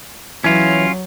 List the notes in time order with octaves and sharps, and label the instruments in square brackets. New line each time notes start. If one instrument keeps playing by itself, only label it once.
[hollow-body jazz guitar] E3 E4 [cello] F#3 [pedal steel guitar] C#4 F4